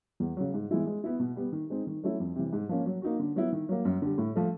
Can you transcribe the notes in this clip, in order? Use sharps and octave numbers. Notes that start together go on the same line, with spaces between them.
E2
C#3 F#3
G#2
E3 G#3 B3 E4
G#3
B3 E4
B2
G3 B3
D#3
G#3 C4 D#4
D#3
F#3 A3 C#4 E4
F2
C3 E3
G#2
F3 A#3 C#4
F#3
A#3 D#4 F#4
D3
F#3 B3 E4
D#3
F#3 A#3
F#2
D3 G3
A2
F3 A3